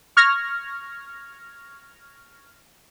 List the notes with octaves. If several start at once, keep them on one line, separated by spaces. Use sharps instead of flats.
C#6 F6 G#6 A#6